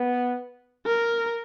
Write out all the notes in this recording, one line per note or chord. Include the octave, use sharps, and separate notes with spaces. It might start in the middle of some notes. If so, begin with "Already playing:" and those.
Already playing: B3
A#4